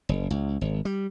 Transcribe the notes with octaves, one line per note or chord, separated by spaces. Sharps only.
F#1
C#2
G#1
G3